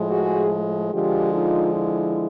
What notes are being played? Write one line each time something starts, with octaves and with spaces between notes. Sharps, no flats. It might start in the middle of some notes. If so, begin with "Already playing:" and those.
Already playing: A2 F3 G#3
F#4 G#4
D3 F3 G#3 F4 G4
D#4 F4
E4